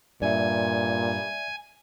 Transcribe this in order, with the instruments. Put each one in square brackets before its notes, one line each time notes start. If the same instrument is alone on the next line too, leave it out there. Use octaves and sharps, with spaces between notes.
[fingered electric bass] G2 [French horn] A#2 [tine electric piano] D5 E5 [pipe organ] G#5